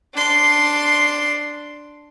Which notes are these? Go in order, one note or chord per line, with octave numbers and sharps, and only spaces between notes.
D4 C6